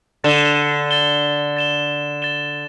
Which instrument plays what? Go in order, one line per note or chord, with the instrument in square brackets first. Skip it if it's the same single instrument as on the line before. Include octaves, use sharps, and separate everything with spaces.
[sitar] D3 [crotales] A6 E7 G7
[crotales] A6 E7 G7
A6 E7 G7
A6 E7 G7